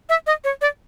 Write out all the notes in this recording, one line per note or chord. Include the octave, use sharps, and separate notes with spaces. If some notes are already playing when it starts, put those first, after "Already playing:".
E5
D#5
C#5
D5